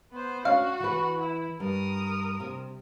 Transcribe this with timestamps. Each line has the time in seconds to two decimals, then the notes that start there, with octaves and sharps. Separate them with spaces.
0.12 B3 C5
0.45 C#4 D4 F#4 F5
0.80 E3 B4
1.19 E4
1.60 G2 A#4 D#6
2.40 C3